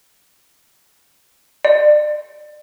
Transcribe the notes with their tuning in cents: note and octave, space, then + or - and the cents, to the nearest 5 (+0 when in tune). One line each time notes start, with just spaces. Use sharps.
D5 +30